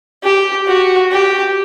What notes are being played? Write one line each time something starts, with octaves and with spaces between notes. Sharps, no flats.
G4
F#4
G4